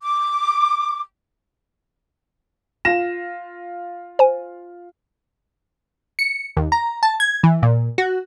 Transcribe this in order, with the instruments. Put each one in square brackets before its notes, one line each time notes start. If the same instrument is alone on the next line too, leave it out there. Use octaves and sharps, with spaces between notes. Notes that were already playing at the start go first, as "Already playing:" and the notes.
[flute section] D6
[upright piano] F4 A#6 E7
[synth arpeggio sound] C5 G#5
[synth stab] C#7
D#2
A#5
A5
G#6
E3
A#2
F#4